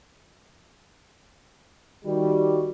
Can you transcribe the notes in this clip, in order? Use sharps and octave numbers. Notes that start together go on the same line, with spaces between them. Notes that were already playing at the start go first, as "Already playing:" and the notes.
D#3 G3 F#4